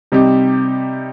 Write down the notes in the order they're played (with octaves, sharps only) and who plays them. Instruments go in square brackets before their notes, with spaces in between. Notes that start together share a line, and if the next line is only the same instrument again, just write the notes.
[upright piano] C3 G3 C4 D#4 G4